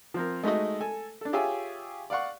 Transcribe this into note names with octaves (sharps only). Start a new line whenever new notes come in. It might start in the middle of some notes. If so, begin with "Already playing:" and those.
F3 C4 A#4
G#3 A3 D#4 F#4 D#5
A4 G#5
D4 A4
F4 G4 G#4 C#5 E5 G#5
D5 F5 F#5 C#6